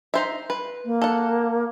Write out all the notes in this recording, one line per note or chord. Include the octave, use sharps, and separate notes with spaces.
D#4 C5 E5
B4
A#3
A4 F#5